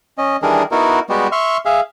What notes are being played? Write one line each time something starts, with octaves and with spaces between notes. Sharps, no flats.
C#4 D#5
D#3 E3 G3 D4 G#4 A#4
B3 D#4 E4 F#4 A#4
G3 G#3 B3 F#4 G4
E5 C6 C#6 F6
G#4 E5 F5